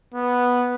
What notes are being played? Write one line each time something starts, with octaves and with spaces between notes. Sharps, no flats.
B3